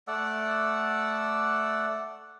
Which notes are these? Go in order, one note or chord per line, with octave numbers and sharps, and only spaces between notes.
A3 D5 F#5 E6